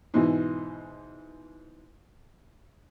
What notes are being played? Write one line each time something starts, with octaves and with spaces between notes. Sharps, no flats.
G#2 B2 E3